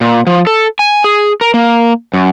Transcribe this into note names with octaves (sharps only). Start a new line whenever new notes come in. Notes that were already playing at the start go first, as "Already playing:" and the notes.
A#2
F3
A4
G#5
G#4
A#4
A#3
F#2